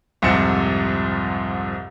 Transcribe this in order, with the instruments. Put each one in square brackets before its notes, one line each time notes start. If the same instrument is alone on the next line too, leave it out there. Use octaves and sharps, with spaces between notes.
[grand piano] C2 F2 G#2 C3 C#7 E7